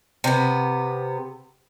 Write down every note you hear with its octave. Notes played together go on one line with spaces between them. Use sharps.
C3 B3